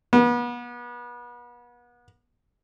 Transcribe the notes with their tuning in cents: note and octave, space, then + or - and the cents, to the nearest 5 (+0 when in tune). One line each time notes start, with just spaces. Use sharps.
B3 -35